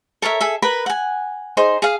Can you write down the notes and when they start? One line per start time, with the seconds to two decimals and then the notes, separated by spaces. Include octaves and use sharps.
0.22 A4 A#4 C#5 E5
0.41 G#4 A4 E5
0.62 A#4 B4 B5
0.86 F#5 G#5
1.57 D#4 G#4 C5 C6
1.82 G#4 F5